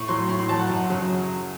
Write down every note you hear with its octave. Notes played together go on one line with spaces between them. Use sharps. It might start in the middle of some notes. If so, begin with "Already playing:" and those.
Already playing: A2 C#6
F#3 C6
A2 C6
C6
F#3 A5
F#5
F#2
C#3 F#3